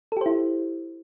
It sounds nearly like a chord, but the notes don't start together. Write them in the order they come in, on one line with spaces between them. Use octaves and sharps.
A4 G4 C5 E4